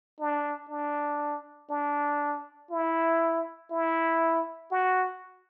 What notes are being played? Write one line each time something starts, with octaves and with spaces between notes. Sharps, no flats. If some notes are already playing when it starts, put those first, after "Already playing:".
D4
D4
D4
E4
E4
F#4